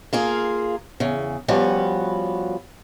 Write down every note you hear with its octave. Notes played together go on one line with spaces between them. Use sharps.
A#3 F4 G#4
E2 C#3
F3 G3 B3 C#4 F#4